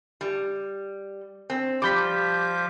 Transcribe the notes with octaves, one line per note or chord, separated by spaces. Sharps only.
G3
C4
F3 G3 D6 G6 B6